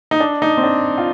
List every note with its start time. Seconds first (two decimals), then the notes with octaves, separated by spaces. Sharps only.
0.11 D#4
0.20 D4
0.42 D#4
0.57 C4
0.63 D4
0.98 F4